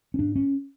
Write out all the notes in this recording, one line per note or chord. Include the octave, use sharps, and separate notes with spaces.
C#4
G#2 D4
C#4